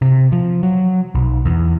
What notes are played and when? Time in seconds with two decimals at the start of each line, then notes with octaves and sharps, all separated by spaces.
0.02 C3
0.32 F3
0.63 F#3
1.15 B1
1.45 E2